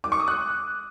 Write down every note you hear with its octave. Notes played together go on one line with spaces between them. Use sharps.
D6
C#6
D#6
F#6